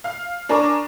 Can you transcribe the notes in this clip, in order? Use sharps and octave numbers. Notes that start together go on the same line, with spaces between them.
F5 F6
D4 A#4 G#5 A#5 C#6 D6